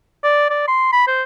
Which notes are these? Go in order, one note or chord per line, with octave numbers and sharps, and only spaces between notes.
D5
D5
C6
B5
C5